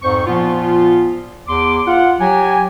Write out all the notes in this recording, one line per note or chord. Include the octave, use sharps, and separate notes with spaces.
F2 G#2 C5 C#6
A#2 F3 B3 F4
E2 C6 D6
F4 F#5
F#3 G4 G#5